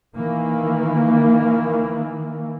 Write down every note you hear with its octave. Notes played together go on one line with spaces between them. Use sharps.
D#3 E3 A#3